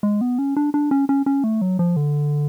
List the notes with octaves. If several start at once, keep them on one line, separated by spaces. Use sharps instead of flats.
G#3
B3
C#4
D4
D4
C#4
C#4
C#4
A3
F#3
F3
D3